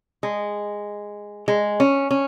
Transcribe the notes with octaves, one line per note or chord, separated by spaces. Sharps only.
G#3
G#3
C#4
C#4